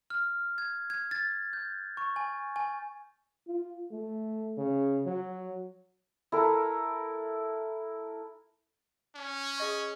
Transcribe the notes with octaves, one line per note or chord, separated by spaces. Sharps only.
F6
G#6
G#6
A6
G6
C#6
G#5
G#5
F4
A3
C#3
F#3
E4 A4 A#4
C#4
G#4 D#5 C#6